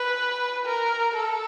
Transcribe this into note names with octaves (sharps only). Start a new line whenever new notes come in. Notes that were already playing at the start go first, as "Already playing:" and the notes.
Already playing: B4
A#4
A4